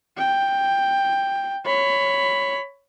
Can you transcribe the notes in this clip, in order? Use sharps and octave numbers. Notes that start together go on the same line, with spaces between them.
G5
C#5 B5